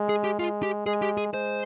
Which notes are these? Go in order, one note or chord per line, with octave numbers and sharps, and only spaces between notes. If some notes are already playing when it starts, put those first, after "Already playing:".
Already playing: G#3
G#4
G4
G#3 F4
G4
G#3 G#4
G4
G#4
G#3 C5